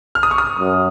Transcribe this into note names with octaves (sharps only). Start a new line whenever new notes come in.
F6
D#6
C#6
D#6
F#2